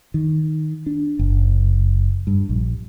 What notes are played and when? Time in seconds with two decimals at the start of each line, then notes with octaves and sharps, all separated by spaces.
0.14 D#3
0.86 D4
1.19 F#1
2.27 G2
2.49 A#1